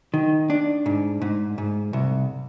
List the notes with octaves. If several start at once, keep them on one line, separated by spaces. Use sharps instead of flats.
D#3
D4
G#2
G#2
G#2
C2